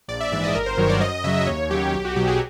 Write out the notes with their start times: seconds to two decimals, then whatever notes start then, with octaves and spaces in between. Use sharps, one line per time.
0.08 A#1 D5
0.20 E5
0.32 G#2 E3 E5
0.43 D#5
0.55 G1 A#4
0.66 C5
0.78 G2 D#3 F#3 C#5
0.89 D5
1.01 F#2 D#5
1.24 C#3 F#3 E5
1.47 D#2 C#5
1.70 C#3 F#3 G4
1.93 B1 G4
2.05 F#4
2.16 B2 F#3 G4
2.27 G#4